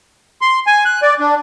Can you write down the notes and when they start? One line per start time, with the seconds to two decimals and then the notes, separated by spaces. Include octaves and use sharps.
0.41 C6
0.67 G#5
0.85 F#6
1.02 D5
1.20 D4